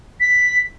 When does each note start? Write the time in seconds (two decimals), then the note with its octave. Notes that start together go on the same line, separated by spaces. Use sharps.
0.20 B6